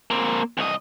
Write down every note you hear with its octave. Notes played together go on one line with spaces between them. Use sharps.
A#3 C4
C2 D#5